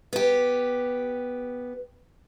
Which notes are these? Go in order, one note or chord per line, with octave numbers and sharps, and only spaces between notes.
B3 G4